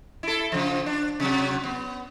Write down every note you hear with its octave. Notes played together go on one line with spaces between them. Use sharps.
E4 A4
C#3 F3
D4
C3 F#3
B3